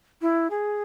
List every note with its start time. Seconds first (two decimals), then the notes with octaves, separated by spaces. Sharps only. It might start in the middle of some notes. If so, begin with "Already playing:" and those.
0.21 E4
0.50 G#4